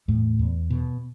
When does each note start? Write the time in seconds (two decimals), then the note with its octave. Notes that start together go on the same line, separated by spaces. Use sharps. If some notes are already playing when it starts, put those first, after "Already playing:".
0.08 E2 A2 A3
0.39 E2
0.70 B2